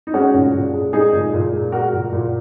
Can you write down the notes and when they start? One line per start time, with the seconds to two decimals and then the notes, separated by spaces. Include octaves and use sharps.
0.07 D#4
0.14 G#3 C#4 F#4
0.34 A#2
0.53 A#2
0.73 G#3
0.93 G#3 D#4 G#4
1.13 A#2
1.33 A#2
1.53 G#3
1.72 G#3 F#4 A#4
1.93 A#2
2.13 A#2